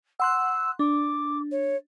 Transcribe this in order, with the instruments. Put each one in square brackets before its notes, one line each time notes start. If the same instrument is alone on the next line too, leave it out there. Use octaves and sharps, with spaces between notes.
[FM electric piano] F#5 C6 F#6 [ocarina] E6
[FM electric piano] D4 [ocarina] D6
[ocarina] C#5